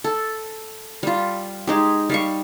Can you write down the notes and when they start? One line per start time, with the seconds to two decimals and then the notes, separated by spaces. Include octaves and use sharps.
0.04 A4
1.03 G3 F4
1.67 G#3 D#4 G4
2.09 G3 F5 C#6